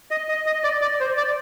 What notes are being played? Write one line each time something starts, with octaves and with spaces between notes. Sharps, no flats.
D#5
D#5
D#5
D5
D5
C5
D5